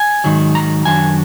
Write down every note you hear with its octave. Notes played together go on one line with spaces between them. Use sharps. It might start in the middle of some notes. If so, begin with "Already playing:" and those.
Already playing: G#5
G#2 D#3 F#3
A#5
F#2 D#3 F#3 D4 G#5